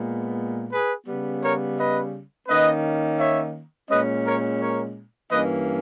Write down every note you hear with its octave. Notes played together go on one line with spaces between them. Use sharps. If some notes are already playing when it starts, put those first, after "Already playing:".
Already playing: A#2 G#3 B3
G#4 B4
C#3 G3 B3
A#4 C#5
B4 D#5
D#3 A#3 C#4 B4 D#5
C#5 E5
A#2 G#3 C#4 B4 D#5
A#4 C#5
A#4 C#5
G2 E3 A#3 C#4 B4 D#5